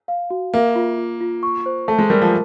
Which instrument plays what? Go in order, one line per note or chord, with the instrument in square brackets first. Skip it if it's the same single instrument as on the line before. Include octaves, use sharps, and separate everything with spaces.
[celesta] F5
F#4
[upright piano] A#3 [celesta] E5
[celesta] F4
F4
F4
C#6
C5
[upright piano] A3 [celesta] A5
[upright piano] G#3
[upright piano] G3 [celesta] A#4
[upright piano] F3